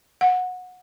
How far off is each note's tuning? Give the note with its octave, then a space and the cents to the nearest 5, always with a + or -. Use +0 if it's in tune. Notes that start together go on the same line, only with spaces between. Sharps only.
F#5 -20